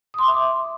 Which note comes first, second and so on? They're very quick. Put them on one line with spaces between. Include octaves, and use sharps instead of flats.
D#6 C6 D6 E5